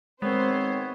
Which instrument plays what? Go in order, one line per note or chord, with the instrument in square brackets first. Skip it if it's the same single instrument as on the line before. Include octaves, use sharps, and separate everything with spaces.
[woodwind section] D#3 C4 C#5 [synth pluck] G#3 [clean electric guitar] B3 [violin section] C5